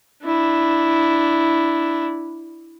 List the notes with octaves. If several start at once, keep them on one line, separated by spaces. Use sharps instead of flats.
D4 E4